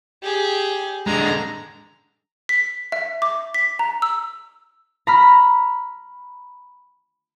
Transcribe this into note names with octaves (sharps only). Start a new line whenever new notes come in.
G4 G#4
D3 G#3 A#5
B6
E5
D6
B6
A#5
E6
A#5 B5 F6